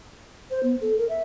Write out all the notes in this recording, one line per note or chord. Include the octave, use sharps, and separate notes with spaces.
C5
B3
A4
A#4
E5